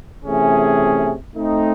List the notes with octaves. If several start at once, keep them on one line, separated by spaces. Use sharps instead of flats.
C3 E3 A3 C#4 G#4
A3 C4 D#4